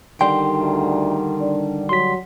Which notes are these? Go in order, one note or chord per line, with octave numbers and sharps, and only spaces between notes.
D3 D#3 G3 G5 C6
D2
D4
F#3 C6 B6